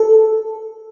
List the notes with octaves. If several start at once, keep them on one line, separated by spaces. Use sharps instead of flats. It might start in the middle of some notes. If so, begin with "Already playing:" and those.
Already playing: A4